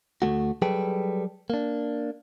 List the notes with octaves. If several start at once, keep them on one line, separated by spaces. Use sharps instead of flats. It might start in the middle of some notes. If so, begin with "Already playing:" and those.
D2 G2 A3 F#4
F#3 G3 G#4 A4 B4 G5
A#3 D4